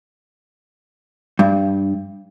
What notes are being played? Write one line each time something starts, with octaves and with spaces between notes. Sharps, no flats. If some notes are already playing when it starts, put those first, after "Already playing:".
G2